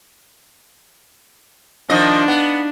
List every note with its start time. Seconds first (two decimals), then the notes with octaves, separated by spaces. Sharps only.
1.90 D#3 F3 D4 D#5
2.28 B3